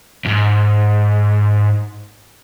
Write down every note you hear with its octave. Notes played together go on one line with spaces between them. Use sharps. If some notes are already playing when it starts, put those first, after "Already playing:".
D#2 G#2